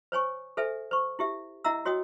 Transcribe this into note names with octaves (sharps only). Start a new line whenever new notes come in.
C5 C#5 G#5 C#6
A4 C5 E5 G#5
C5 C#6
E4 G4 E5
E4 D#5 E5 F#5 A#5 E6
F#4 C#5 D#5 G5 D#6